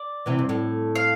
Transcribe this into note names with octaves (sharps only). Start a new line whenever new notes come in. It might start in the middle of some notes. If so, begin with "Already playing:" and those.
Already playing: D5
C3 E3
G2
A2
F5